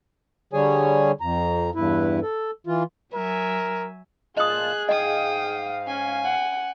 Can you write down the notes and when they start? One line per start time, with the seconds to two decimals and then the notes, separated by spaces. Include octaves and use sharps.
0.53 D3 G3 G#4 C#5 G#5
1.21 F2 A#5
1.75 E2 G2 E4 B4
2.22 A4
2.67 E3 F4
3.13 F#3 A#4 E5 G#5
4.37 A#2 F4 G#4 D#5 A5 D#6 F#6
4.89 G#2 D#5 F5 G5 D#6
5.87 C#4 G#5
6.24 F#5